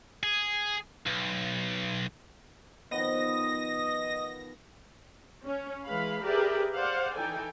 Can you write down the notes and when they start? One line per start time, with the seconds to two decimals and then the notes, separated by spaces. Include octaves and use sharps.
0.23 G#4
1.06 B1
2.91 D#3 F3 B3 D#5 A#6
5.45 C#4
5.87 E3 G#3 B4 F5 B5
6.23 G4 G#4 A#4 B4 D5 E5
6.75 C5 D5 F5 F#5
7.15 E3 D#4 A4 G5 G#5